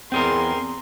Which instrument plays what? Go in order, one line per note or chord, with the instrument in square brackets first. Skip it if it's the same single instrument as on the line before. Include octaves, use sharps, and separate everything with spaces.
[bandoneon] E2 [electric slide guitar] C4 G#4 A#4 [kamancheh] C6